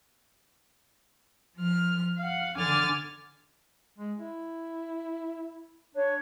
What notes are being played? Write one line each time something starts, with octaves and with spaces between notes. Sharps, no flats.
F3 F6
F5 F#5
D3 G#5 D6 F6 A6
G#3
E4
D4 C#5